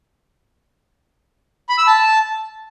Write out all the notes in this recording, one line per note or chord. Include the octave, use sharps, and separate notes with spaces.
B5
E6
A5